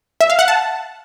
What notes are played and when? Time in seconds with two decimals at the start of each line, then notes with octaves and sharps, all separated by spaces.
0.21 E5
0.30 F5
0.39 F#5
0.48 A5